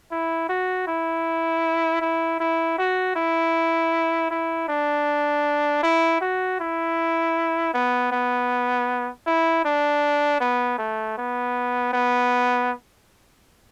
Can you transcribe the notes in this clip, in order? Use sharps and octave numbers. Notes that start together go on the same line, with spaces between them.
E4
F#4
E4
E4
E4
F#4
E4
E4
D4
E4
F#4
E4
B3
B3
E4
D4
B3
A3
B3
B3